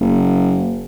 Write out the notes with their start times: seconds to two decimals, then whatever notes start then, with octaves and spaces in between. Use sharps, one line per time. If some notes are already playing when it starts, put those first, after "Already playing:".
0.01 F#1